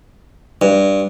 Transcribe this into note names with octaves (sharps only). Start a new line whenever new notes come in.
G2